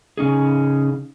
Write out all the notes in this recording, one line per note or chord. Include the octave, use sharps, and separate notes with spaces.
C#3 C#4 D#4 G#4